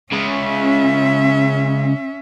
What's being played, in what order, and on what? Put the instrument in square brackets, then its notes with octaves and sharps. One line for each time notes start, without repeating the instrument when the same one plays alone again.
[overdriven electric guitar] C#3 G#3 [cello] C#4 E5